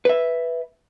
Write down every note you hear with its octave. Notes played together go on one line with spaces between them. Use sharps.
B4 E5